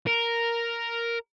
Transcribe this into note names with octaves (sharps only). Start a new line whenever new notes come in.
A#4